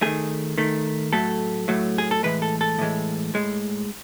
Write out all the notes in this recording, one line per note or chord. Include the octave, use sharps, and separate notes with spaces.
D#3 A3 G#4
D#3 A3
A2 F#3 A3 A4
A2 F#3 A3
G#4
A4
A2 E3 G#3 B4
A4
A4
A2 E3 G#3
A2 G#3